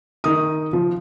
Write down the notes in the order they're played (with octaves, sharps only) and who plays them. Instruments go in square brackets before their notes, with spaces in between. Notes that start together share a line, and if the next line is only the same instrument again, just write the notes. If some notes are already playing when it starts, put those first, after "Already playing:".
[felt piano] D#3 D#6
F3